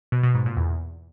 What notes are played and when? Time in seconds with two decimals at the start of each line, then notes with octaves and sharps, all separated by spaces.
0.12 B2
0.23 B2
0.34 G#2
0.46 A#2
0.57 E2